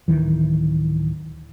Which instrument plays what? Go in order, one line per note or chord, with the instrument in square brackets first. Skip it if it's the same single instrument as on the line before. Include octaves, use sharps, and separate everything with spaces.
[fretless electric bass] D1 C2 D#3 E3